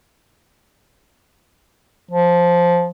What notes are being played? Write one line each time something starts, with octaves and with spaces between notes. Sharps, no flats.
F3